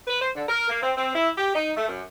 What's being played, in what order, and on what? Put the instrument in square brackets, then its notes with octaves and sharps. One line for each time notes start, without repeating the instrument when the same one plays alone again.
[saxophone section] B4
C5
D3
A#4
A#3
C4
C4
E4
G4
D#4
A3
F#2